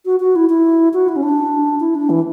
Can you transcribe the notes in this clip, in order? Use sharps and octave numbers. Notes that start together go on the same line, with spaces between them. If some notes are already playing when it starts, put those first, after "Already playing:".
F#4
F#4
E4
E4
F#4
E4
C#4
D4
E4
D4
E3